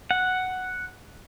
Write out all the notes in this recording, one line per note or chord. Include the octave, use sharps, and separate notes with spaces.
F#5